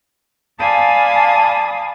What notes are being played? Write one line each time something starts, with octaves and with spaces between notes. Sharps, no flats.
D5 F5 G#5 A5 B5 D#6